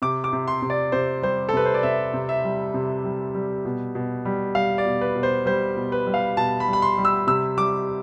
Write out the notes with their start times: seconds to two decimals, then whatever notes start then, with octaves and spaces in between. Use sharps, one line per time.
0.02 C3 D6
0.24 D6
0.33 C3
0.48 C6
0.62 C3
0.70 D5
0.92 C3 C5
1.22 G3 C5
1.49 A4
1.53 C3 B4
1.65 C5
1.74 D5
1.83 C3 E5
2.14 C3
2.29 E5
2.44 G3
2.74 C3
3.05 G3
3.34 G3
3.65 B2
3.95 B2
4.25 G3
4.55 G3 F5
4.78 D5
4.85 B2
5.01 B4
5.15 B2
5.23 C5
5.46 G3 C5
5.76 B2
5.92 B4
6.07 G3
6.14 F5
6.37 B2 A5
6.60 B5
6.68 G3
6.73 B5
6.82 C6
6.98 G3
7.05 E6
7.27 C3 E6
7.57 G3 D6